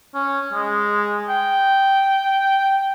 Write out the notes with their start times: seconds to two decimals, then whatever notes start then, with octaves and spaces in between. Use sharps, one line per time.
0.14 C#4
0.53 G#3
1.29 G5